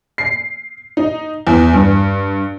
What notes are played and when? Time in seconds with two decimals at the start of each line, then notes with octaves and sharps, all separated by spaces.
0.18 C7
0.97 D#4
1.47 E2
1.73 G2